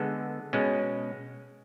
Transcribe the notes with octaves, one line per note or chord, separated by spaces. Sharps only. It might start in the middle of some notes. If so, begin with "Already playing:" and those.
Already playing: D3 G#3 B3 A4
B2 G#3 C#4